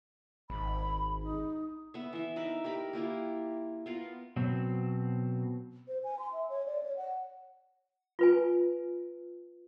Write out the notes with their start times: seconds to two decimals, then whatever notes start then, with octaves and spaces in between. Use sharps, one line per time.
0.50 G#1 B5
1.22 D#4
1.94 B3 E5
2.13 E3 E5
2.36 D#4 A#4 B4 E5
2.64 G4 A#4 B5
2.93 A#3 E4 F4 G4
3.86 B3 F4 A#4
4.36 B2 F#3 C4
5.88 C5
6.04 G#5
6.19 C6
6.33 E5
6.49 C#5
6.66 D5
6.83 C#5
6.97 F#5
8.19 F4 B4 G#5